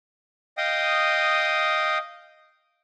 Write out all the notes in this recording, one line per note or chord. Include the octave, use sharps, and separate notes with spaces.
D#5 F5 G5 D#6